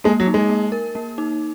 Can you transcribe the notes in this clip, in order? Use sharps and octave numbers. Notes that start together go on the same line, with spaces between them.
G#3 A#3
F#3
D#4
G#3
A#3
A#4
A#3
D#4